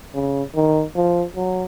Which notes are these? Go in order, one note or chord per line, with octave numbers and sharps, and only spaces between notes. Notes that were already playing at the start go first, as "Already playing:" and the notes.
C#3
D#3
F3
F#3